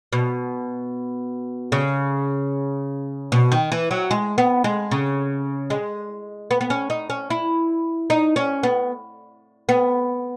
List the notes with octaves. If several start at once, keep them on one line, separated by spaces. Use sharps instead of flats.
B2
C#3
B2
D#3
E3
F#3
G#3
B3
G#3
C#3
G#3
B3
B3
C#4
D#4
C#4
E4
D#4
C#4
B3
B3